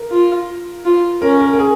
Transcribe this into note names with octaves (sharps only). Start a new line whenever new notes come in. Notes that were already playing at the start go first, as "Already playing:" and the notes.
Already playing: A#4
F4
F4
C#4 A#4
A#4
A#4
G#4